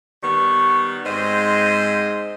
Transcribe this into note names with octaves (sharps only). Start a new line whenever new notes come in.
D#3 G3 B3 C#6
G#2 C4 C5 D#5